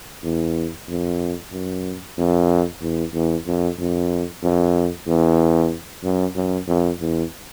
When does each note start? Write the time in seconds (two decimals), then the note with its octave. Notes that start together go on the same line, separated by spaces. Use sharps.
0.24 E2
0.88 F2
1.53 F#2
2.18 F2
2.82 E2
3.14 E2
3.47 F2
3.79 F2
4.43 F2
5.07 E2
6.03 F#2
6.36 F#2
6.68 F2
7.01 E2